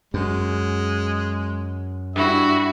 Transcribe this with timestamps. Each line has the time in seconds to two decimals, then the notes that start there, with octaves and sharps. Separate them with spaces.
0.14 F#2 G#3
2.16 G2 E4 F#4 E5